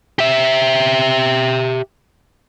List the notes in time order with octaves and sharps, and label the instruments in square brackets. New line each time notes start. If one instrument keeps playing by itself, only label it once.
[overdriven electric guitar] G4 E5